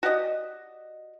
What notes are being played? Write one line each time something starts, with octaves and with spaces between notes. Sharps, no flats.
F#4 G4 D5 D#5